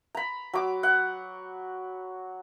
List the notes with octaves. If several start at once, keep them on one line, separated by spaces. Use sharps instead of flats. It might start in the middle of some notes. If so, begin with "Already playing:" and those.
A#5 B5
F#3 D6
F#5